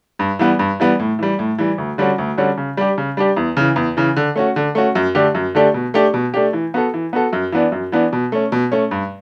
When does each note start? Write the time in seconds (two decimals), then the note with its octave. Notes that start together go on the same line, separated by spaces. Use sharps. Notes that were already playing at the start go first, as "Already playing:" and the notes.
0.19 G2
0.39 E3 G3 B3
0.59 G2
0.80 E3 G3 B3
0.99 A2
1.19 E3 G3
1.39 A2
1.58 E3 G3
1.78 D2
1.98 D3 G3 C#4 F#4
2.18 D2
2.37 D3 G3 C#4 F#4
2.57 C#3
2.77 G3 D4 G4
2.98 C#3
3.17 G3 D4 G4
3.37 E2
3.57 C#3 E3
3.76 E2
3.97 C#3 E3
4.16 D3
4.36 A3 C#4 F#4
4.56 D3
4.75 A3 C#4 F#4
4.95 F#2
5.15 D3 A3 D4 G4
5.35 F#2
5.55 D3 A3 D4 G4
5.74 B2
5.94 A3 D4 G4
6.14 B2
6.34 A3 D4 G4
6.53 E3
6.74 B3 F#4 A4
6.94 E3
7.13 B3 F#4 A4
7.33 F#2
7.52 E3 B3 D4
7.72 F#2
7.92 E3 B3 D4
8.13 B2
8.32 A3 C#4
8.52 B2
8.72 A3 C#4
8.91 G2